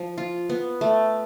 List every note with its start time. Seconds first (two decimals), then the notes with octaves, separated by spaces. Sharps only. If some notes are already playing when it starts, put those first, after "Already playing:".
Already playing: F3
0.18 F4
0.49 B3
0.81 A3